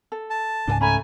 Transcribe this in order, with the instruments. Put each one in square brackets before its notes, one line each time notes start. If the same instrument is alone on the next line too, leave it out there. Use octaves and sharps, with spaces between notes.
[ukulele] A4
[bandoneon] A5
[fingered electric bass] C#2 G#2 C#3 [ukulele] D4 A4 G#5
[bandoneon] A3 [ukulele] C#4 A#5 B5 [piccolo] G#5